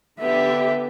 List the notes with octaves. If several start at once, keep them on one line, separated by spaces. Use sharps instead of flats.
D3 B3 G4 E5